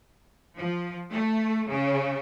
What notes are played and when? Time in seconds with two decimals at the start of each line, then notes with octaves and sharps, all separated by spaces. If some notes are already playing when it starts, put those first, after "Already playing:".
0.57 F3
1.12 A3
1.69 C#3